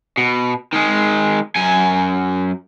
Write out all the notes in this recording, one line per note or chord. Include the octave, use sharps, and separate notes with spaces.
B2
D#3 G#3
F#2 G#5